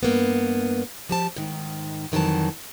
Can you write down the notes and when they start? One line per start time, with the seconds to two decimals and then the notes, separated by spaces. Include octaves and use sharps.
0.03 G2 A#3 B3
1.09 F3 G4 A5
1.36 G#2 D#3
2.12 F2 D#3 E3 F#3 A5